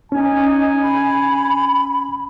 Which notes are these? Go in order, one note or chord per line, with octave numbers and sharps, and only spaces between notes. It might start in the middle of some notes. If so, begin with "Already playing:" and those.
C#4 D#4 G#5
B5